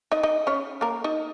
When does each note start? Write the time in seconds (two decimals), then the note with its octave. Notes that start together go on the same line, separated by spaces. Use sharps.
0.12 D#4 D#5
0.23 D#4 D#5
0.47 C#4 C#5
0.81 A#3 A#4
1.04 D#4 D#5